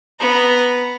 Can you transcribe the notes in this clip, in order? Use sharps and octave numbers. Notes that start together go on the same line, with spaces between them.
B3 A#5